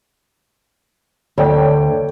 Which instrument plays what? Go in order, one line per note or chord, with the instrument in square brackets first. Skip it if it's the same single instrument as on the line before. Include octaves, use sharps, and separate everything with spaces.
[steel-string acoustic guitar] D2 [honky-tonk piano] C#5 D5 G5